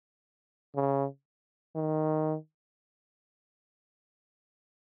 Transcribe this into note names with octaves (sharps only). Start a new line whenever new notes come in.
C#3
D#3